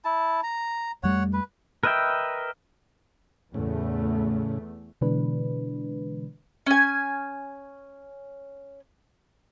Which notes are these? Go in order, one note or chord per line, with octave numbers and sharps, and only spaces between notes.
E4 A5
A#5
F2 G3 A3 C#5 F#5
B4
A#4 B4 D#5 E5 G5
E2 A2 C#3 A3
B2 D3 E3 G#3 D4 B4
C#4 G#5